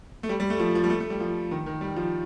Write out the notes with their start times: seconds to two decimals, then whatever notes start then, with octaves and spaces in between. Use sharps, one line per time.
0.23 A3
0.29 G3
0.40 G3
0.50 A3
0.60 F3
0.75 F3
0.84 G3
0.90 A3
1.00 A3
1.10 G3
1.20 F3
1.51 D#3
1.66 D#3
1.81 G3
1.96 F3